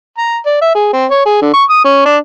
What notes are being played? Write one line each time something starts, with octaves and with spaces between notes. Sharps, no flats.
A#5
D5
E5
G#4
C4
C#5
G#4
D3
C#6
D#6
C#4
D4